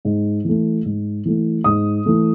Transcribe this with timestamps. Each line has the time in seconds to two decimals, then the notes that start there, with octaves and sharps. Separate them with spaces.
0.05 G#2
0.45 E3 A3
0.85 G#2
1.25 E3 A3
1.64 G#2 D#6
2.06 E3 A3